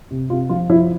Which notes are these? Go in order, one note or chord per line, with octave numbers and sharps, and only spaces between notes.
C3
C3 F4
F3 F4
F3 E4